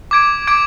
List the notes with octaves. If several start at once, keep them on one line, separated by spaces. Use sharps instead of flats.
D6 G#6 D7
D6 G#6 D7